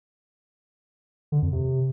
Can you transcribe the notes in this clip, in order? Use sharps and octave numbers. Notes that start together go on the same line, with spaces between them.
D3
F2
C3